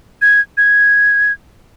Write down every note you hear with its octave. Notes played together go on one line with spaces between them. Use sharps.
G#6
G#6